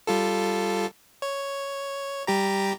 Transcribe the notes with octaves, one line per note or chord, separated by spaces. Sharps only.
G3 F4 A4
C#5
G3 G4 A#5